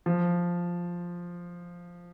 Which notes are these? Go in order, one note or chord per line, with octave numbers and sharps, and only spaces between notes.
F3